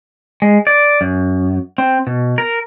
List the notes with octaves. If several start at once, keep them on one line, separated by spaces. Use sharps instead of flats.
G#3
D5
F#2
C4
B2
A#4